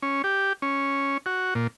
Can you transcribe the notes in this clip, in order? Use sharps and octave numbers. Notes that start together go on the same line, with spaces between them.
C#4
G4
C#4
F#4
A#2